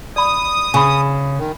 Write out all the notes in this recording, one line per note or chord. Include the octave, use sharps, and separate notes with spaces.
D5 B5 D#6
C#3 G#5 B5
D#3